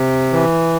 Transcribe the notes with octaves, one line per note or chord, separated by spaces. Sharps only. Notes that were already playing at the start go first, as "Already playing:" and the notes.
Already playing: C3
E3